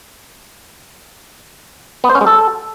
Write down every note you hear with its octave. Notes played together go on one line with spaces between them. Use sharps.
B3
C5
C#4
G#3
A4